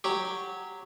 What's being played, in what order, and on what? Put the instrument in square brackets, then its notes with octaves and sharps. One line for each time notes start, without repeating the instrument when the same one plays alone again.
[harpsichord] F#3 G4